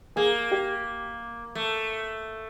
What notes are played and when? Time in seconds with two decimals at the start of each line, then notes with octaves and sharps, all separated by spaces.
0.16 A#3 G#4
0.51 G4
1.55 A3